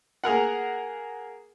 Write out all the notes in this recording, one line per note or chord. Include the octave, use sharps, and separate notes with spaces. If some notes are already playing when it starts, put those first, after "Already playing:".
A#3 G#4 A#4 F#5